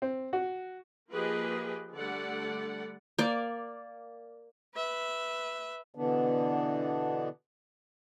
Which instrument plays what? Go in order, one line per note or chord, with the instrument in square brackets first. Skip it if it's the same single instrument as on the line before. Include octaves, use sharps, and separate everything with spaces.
[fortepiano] C4
F#4
[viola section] F3 A#3 G4 G#4 B4 D#5
D3 G3 A3 D5 F#5
[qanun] A#3 D5
[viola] B4 E5
[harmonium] B2 D3 E3 B3 D4